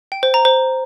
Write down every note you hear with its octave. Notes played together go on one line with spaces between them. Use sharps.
G5
C5
A#5
C5